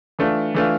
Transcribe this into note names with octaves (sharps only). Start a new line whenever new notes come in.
E3 A3 D4 F4
E3 A3 D4 F4